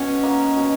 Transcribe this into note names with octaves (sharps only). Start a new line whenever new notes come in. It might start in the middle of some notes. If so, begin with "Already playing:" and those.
Already playing: B2 C#4
A#3 D#4 F#4
B2